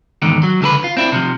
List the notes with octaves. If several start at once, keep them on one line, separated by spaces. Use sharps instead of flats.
E2 G#2 D3 D#3
F#3
C#2 D3 A4 B4
F4
C4 D4 E4
C3 D#3 F3